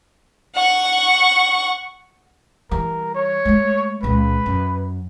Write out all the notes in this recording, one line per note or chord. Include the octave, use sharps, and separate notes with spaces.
F#5 C#6
E3 G3 A#4
C#5
G#3 A3
C#2 A#2 B4
F#2